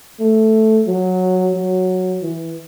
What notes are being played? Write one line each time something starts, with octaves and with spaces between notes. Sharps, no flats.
A3
F#3
F#3
E3